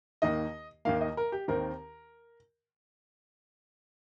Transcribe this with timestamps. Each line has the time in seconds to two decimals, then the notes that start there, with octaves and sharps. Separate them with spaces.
0.22 D#2 D#3 A#3 D#5
0.85 D#2 D#3 A#3 F5
1.01 D#5
1.17 A#4
1.32 G4
1.48 D#2 D#3 C4 A#4